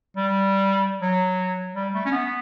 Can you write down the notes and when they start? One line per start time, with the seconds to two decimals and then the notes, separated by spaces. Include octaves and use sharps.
0.17 G3
1.02 F#3
1.75 G3
1.94 A3
2.05 C#4
2.12 B3